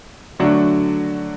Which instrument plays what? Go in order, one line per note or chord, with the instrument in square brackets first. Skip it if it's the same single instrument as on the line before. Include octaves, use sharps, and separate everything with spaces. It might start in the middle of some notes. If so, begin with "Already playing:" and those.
[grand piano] D3 F#3 A3 D4 F#4